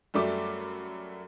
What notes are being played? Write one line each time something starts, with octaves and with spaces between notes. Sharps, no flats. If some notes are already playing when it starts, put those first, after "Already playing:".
F#2 G3 A3 D6